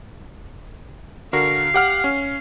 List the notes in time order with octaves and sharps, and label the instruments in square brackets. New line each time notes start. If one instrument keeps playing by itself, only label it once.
[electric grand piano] D3 F#4 A#4 [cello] F5
[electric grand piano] G4 F#5 F6
C#4